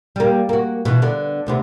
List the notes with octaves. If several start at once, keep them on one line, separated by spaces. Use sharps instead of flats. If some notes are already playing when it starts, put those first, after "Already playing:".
G3 A#3
A#3 F#4
B2 E3
D3 B3
D2 C3 B3